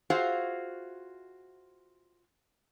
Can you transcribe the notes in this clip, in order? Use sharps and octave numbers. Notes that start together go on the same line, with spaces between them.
F4 F#4 G#4 C5 E5 F5